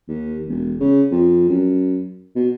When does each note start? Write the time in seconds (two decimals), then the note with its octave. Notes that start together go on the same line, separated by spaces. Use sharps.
0.08 D#2
0.48 E1
0.80 C#3
1.11 F2
1.49 F#2
2.35 B2